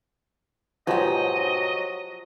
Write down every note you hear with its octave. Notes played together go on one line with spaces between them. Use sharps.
B1 G#2 F3 F#3 G4 D#5